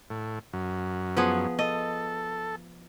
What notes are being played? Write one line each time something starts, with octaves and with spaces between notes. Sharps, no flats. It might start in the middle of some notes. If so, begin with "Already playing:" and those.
A2
F#2
F3 B3 G#4
A4 D#5